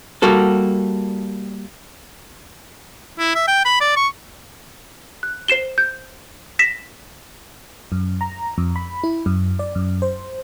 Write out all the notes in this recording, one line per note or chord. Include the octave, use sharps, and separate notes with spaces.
G3 A#3 F#4 A4
E4
E5
G5
B5
D5
C#6
F#6
C5 C7 E7 G7
G6
A#6 B6 E7
F#2
A#5
F2
B5
E4
F#2
D5
F#2
C5